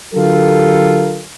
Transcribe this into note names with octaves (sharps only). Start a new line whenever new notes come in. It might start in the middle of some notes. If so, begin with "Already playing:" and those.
D3 F#3 F4 G4 A4 A#4